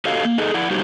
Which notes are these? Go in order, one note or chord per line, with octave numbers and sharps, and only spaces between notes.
F#4 G4 A4 C#5 D#5 F5
A#3
D#4 G#4 A4 D#5
E4 D5 F#5
G3 D#4 F#4 G4 C5 C#5